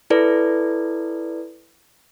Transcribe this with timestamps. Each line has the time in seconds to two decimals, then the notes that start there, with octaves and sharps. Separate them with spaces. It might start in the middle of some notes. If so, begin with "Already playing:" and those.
0.10 E4 A4 B4 D5